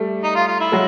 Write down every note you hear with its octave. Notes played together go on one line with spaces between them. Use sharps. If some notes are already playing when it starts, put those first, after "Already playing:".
Already playing: G3 A3
D#4
F4
F4
E4
F#3 G#3